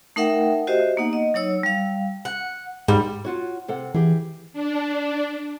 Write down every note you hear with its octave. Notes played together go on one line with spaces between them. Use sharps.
A3 D#4 A#4 E5 F#5 G5
F#4 G4 C5 D#5 E5
A#3 B3 D#4 F#5
D#5
F#3 D#4 C#5 E6
G3 F5
F#5
G#2 G3
F4 F#4 C#5
C3 A4 F#5
E3 G4 G#4
D4